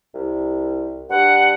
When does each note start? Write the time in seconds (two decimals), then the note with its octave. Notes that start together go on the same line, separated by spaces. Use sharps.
0.14 C2
1.10 G2 F#5